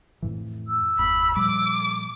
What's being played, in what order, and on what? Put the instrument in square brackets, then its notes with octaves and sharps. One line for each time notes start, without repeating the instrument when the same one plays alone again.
[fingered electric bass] F2 A2 E3
[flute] E6
[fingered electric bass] G1 E2 [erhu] B5
[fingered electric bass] A#2 F3 G3 [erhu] D6